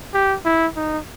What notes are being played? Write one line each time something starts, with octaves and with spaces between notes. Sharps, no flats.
G4
E4
D#4